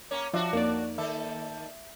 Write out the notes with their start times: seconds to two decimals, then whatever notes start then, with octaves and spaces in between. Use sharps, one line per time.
0.11 A#3 C#4 C#5
0.34 F3 D4 F4 F#4 E5
0.53 F2 A#3 D#4 D5
0.98 D#3 A4 E5